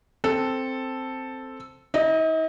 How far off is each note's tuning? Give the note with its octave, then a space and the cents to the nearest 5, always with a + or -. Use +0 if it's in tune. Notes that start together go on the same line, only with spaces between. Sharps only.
C4 +0 A4 +0
D#4 +45 D#5 -15